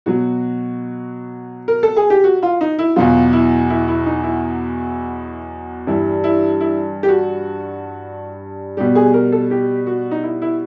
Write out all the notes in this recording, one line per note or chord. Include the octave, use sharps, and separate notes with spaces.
B2 F#3 F#4
A#4
A4
G#4
G4
F#4
F4
D#4
E4
E2 B2 F#3 F4
E4
E4
E4
D#4
E4
G2 E3 G3 E4
E4
E4
G4
F#4
B2 G3 G4
G#4
A#4
A4
G4
F#4
D#4
E4
E4